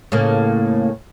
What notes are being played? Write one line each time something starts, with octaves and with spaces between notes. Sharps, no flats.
A2 C#3 A#3